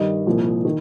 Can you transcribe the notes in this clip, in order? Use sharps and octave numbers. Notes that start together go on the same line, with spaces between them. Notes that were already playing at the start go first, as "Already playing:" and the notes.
Already playing: G2 D#3 G3 D#5
C2 A#2 F3
D#3